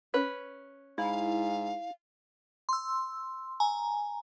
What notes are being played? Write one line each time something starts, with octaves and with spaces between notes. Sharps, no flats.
C#4 B4
G#2 E4 F5
C6 E6
G#5 A#5